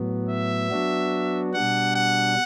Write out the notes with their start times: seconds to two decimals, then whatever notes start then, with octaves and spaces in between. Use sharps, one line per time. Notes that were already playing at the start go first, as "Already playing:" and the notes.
Already playing: A2 F#3 B3
0.29 E5
0.71 F#3 B3 D4 F#4
1.54 B2 G3 D4 F#5
1.96 F#5